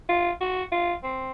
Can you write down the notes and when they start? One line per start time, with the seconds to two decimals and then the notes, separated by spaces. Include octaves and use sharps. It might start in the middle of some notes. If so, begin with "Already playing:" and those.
0.09 F4
0.41 F#4
0.72 F4
1.03 C4